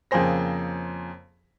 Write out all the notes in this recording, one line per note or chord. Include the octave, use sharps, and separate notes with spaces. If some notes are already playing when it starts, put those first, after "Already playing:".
F2 C#3 A#3 G#4 C5 A#6